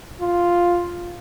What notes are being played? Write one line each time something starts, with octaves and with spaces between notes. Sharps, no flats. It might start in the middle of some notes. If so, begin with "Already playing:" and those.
F4